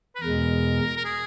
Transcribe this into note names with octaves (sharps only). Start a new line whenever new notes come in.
B4
E2 B2 G#3 A#4
A#4
G#4